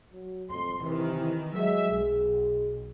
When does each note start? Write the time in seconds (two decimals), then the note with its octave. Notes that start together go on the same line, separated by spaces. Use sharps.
0.13 F#3
0.51 F2 C6
0.84 C3 D#3 E3
1.55 F#3 G#3 E5
1.91 B1 G#4